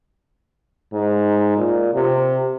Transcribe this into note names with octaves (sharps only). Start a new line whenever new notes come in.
G#2
A#2
C3